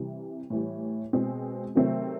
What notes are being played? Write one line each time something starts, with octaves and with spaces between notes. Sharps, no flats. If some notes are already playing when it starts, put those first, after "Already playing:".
Already playing: C3 E3 G3
A2 E3 G3
B2 G#3 C4
C3 D#3 F#3 A3 C4